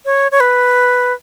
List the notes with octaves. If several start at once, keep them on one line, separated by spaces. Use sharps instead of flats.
C#5
C#5
B4